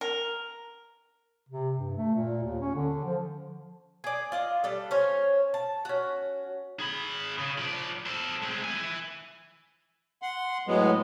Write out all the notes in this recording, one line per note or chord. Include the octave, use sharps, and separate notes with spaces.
A#4
C3
G2
A3
A#2
D#2
C#4
D3
F3
G#4 D5
F4 D5 D#5
G3 D4 A4
C#4 C5 C#5
A5
C#4 F#4
G#4 B5
C#3
F3 D5
A4 C5
G#3 C4
E4 G#5
F#5 C6
A2 F#3 G#3 B3